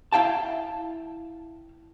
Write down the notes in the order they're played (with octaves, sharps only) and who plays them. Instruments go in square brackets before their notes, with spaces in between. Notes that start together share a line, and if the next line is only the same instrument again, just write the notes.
[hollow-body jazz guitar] E4 F5 G5 A5